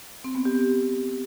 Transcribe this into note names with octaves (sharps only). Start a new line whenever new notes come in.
C4
B3
G4